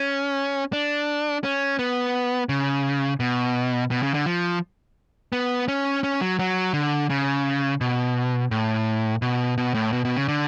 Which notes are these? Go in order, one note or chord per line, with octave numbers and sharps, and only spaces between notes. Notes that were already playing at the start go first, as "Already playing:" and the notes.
Already playing: C#4
D4
C#4
B3
C#3
B2
B2
C#3
D3
F3
B3
C#4
C#4
F#3
F#3
D3
C#3
B2
A2
B2
B2
A2
B2
B2
C#3
D3